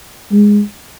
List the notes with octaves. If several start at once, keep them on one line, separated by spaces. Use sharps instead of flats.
G#3